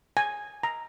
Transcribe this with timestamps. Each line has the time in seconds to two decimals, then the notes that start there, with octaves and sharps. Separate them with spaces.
0.17 G#5
0.63 A#5